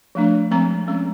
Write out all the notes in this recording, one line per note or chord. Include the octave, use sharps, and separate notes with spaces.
F3 A3 D4
F3 G#3 C4 A#5
F3 G#3 C#4